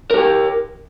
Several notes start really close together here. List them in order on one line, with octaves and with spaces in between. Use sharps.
A#4 G4 G5